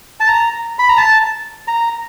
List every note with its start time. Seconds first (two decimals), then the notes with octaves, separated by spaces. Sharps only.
0.20 A5
0.28 A#5
0.79 B5
0.89 A#5
0.97 A5
1.68 A#5